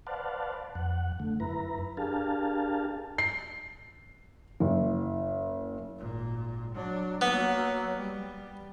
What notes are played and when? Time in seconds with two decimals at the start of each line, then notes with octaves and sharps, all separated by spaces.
0.07 B4 C5 D5 F5 F#5 A5
0.75 F2 F#5
1.20 D3 A3
1.40 F#2 E4 B4 A#5
1.97 D4 G4 G#4 A#4 F5 A5
3.18 C7
4.60 F#1
5.98 G#1 A#2
6.74 F#3 D4
7.21 F#3 A#3 B3
7.97 G3